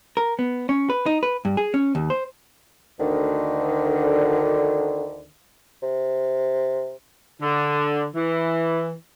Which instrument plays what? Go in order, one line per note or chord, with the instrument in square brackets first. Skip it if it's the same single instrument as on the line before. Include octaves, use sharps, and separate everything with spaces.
[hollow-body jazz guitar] A#4
B3
C#4
B4
D#4
B4
G2
G#4
C#4
D#2
C5
[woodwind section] D2 D3 D#3
[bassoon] C3
[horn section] D3
E3